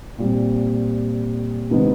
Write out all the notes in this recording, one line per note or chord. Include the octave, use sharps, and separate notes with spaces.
A#2 G3 C4
C3 D#3 G#3 B3